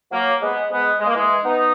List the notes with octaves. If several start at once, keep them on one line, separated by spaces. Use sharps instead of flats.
F#3 A#3
G#3 B3
G#3 B3
G#3
A#3
E3 G#3
B3 D#4